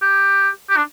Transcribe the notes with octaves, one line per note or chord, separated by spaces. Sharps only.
G4
G4
D4